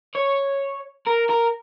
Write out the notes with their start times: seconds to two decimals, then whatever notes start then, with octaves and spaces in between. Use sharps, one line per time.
0.15 C#5
1.07 A#4
1.30 A#4